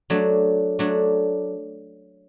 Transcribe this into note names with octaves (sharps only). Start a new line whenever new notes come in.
F#3 A3 D4
F#3 A3 D4